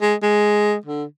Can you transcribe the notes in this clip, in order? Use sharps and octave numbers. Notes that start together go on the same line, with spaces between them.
G#3
G#3
D3